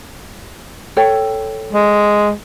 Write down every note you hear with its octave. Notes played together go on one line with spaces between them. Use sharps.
A4 C#5 G5
G#3